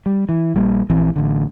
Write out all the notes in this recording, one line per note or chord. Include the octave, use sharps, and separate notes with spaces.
G3
E3
A#1 G3 A#3
A#1 E3 C4
A1 D3